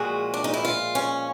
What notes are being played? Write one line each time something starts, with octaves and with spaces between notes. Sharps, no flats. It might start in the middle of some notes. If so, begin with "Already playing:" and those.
Already playing: A#2 F3 G#3 F#4
D4
D#4
E4
F4
C#4